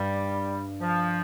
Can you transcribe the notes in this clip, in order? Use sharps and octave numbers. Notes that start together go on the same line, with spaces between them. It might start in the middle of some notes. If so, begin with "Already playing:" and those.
Already playing: G2 G3
F3